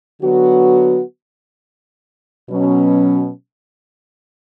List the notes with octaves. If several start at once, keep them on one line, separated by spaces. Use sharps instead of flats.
D3 F#3 B3 F#4
B2 F#3 C#4